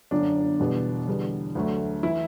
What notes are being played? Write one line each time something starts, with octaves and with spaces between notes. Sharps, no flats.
G1 F#2 D3 D4
E2 B2 G3 B3
E2 D3 G3 B3
D2 D3 F#3 A3
E3 E4